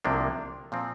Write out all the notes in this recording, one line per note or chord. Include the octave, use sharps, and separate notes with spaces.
C2 C3 F3 A#3 D4
A#2 F3 C4